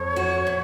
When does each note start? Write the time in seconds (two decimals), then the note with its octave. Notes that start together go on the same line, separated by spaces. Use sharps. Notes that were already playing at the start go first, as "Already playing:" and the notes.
Already playing: F2 C#5
0.16 F#4
0.47 A#2